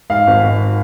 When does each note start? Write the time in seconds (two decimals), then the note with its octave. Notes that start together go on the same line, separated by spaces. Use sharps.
0.10 G#2 F5
0.27 G#1
0.43 G#1